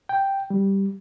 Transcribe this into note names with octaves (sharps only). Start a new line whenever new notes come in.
G5
G3